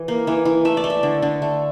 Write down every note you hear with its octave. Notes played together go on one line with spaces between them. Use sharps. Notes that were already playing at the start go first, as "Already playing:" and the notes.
Already playing: E3
A#3
E3
E3
A3 E5
D5
A3
E5
D3
D3
A3